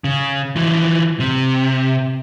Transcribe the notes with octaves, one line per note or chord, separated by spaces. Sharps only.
C#3
E3 F3
C3